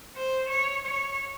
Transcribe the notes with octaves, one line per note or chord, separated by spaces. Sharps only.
C5
C#5
C#5